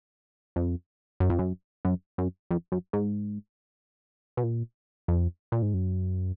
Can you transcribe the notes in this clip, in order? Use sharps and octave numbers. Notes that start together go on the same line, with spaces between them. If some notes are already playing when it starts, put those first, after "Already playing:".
F2
F#2
F2
F#2
F#2
F#2
F2
F#2
G#2
B2
A#2
F2
A#2
G#2
F#2